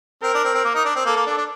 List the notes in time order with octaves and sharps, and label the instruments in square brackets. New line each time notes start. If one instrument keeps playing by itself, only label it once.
[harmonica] C4 [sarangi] A#4
[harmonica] D4
C4
C4
A#3
D#4
D4
C4
[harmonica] A#3 [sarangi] A4
[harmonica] A#3
D4
D4